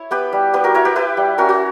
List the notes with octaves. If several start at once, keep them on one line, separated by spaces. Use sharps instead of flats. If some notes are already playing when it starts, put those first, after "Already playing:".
Already playing: E4 C#5
B3 G4 B4
G3
B3 G4 B4
F#4 A#4
E4 A#4 C#5
G4 B4
E4 G4 B4
G3
C#4 F#4 A#4
F#4